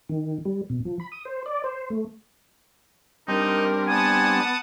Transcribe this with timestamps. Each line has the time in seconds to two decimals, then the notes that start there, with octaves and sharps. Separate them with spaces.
0.09 D#3
0.45 G3
0.70 B2
0.85 F3
1.00 B5
1.12 D#6
1.25 C5
1.46 D5
1.64 C5
1.90 A3
3.28 G3 C4 D4 D#4 A#4
3.87 B3 F#5 G#5 A5 D#6